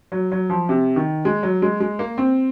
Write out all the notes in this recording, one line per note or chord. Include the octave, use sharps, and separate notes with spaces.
F#3
F#3
F3
C3
D#3
G#3
F#3
G#3
G#3
A#3
C4